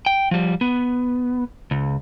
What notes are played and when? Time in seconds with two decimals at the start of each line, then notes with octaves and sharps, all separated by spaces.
0.06 G5
0.31 F3 G3
0.61 B3
1.71 C#2